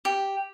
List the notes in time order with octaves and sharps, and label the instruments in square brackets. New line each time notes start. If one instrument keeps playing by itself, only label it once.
[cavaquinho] G4